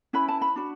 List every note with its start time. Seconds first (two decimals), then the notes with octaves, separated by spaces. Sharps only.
0.13 C#4 E4 B4 B5
0.28 A5
0.41 B5
0.56 D4 F#4